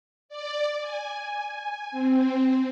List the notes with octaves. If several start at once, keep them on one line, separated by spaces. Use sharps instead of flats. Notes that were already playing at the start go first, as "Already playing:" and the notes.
D5
G#5
C4